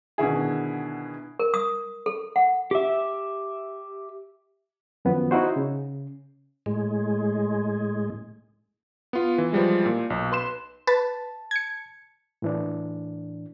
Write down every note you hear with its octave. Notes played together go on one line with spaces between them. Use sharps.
B2 D3 D#3 E4 G#4
A#4
D#6
A4
F#5
G4 E5
F#2 D#3 F3 B3
D#4 E4 F#4 C5
C#3
A2 G#3
B3 F4
E3
E3 F3 G3 G#3
A#2
B1
B4 C6 E7
B4 A5 A6
G#6 C#7
A2 E3 D4